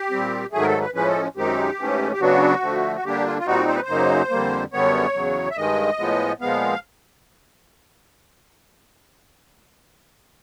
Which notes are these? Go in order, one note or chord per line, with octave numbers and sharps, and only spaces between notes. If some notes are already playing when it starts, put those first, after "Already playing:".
Already playing: G4
A#2 G3 C4
G#2 D#3 F#3 A3 G#4
A#4
A4
B4
A2 F3 G#3 C#4 B4
A4
F#2 D#3 G#3 C4 D#4 G4
G#2 E3 A3 C#4
G4
C#3 F#3 B3 D4 F#4
D3 F3 A3
F#4
D3 G3 A#3 D4 G4
F4
F4
A#2 G3 C4 D#4 F#4
C5
B4
C5
F#2 C#3 F#3 A#3 D#4
F2 D3 G3 A#3
F#2 D3 G3 B3 C#5
E2 C#3 F#3
E5
G2 D#3 G#3 D#5
A2 F3 G#3 B3
A#2 F3 G#3 B3 F5